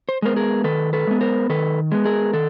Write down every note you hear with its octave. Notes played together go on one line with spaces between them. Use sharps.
C5
G#3 B3 A#4 C5
G#4 A#4
D#3 A4 B4
A4 B4
G#3 B3
A#4 C5
D#3 A4 B4
G#3 B3
G#4 A#4
D#3 A4